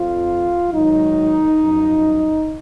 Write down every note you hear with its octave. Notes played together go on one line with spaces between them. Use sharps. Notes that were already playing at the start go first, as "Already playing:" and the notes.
Already playing: F2 F3 F4
G#2 D#3 F#3 D#4
F#2 F3